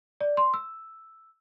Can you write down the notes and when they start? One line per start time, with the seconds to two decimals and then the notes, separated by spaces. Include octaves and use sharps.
0.21 D5
0.37 C6
0.54 E6